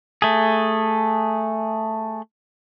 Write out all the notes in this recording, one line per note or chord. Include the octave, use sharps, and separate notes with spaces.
A3 G#4